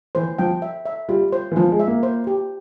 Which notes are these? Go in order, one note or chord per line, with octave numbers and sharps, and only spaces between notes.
E3 C5
F3 G5
E5
E5
G3 F4
C5
E3
F3 F4
G#3
E5
A#3
C5
G4